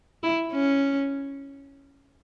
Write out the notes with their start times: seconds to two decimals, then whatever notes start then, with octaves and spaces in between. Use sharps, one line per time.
0.23 E4
0.52 C#4